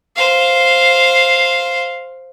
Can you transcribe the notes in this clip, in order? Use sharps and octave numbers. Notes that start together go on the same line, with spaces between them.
C5 F5